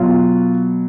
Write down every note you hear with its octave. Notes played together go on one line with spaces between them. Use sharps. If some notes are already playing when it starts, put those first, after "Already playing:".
Already playing: B2 F#3 F4 F5